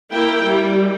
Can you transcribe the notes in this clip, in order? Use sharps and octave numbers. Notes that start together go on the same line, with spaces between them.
A#3 E4 A#4 G5
G3